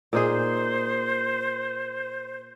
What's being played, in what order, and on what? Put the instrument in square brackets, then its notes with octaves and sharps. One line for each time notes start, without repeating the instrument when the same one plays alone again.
[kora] A#2 D#4 G#4 [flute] C5